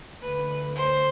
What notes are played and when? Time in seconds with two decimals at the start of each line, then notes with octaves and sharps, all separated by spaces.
0.22 D2 D3 B4
0.75 C5